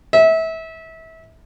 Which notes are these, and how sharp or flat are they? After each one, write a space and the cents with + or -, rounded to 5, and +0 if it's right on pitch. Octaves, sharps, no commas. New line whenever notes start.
E5 -25